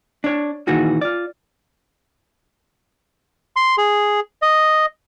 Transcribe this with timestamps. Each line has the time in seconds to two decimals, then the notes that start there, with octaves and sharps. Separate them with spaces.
0.24 D4 C#5
0.67 A#2 D#3 E3 F#4 G#4
1.01 F4 D5
3.56 C6
3.78 G#4
4.42 D#5